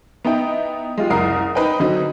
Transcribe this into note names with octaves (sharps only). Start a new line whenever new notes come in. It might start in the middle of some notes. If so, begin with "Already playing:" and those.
B3 D#4 E4 G5
G#3 F4 G4
F#1 C2 A#4 A#5 D#6 C7
D#4 B4 C5 G5
D3 F#3 C4 D#4